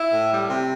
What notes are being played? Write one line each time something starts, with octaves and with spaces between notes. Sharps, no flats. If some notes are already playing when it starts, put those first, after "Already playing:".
Already playing: E4
A2
G3
C3